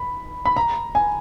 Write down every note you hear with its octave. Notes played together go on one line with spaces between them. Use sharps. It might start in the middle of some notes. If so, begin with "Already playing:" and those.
Already playing: B5
B5
A#5
G#5